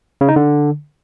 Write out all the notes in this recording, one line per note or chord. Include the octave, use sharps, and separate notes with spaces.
C#3
D#4
D3